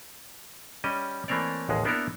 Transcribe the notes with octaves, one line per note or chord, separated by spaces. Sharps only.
G3 C#4 D#5
E3 A3 A#3 C4 C#5 D5
A1 D#2 G#3
A#3 B3 D4 E4 A4 A#4